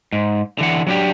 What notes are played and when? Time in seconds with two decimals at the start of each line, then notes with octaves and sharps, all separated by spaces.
0.12 G#2
0.58 D3 E3 F#5
0.87 F#3 D4 G4